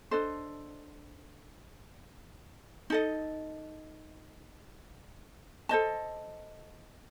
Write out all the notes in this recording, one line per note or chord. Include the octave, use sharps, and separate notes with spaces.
D4 A4 C5 D#5
D#4 A4 D#5
A4 C5 D#5 A5